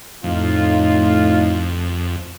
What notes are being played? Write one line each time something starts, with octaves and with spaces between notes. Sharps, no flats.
F2 A2 D#4 F4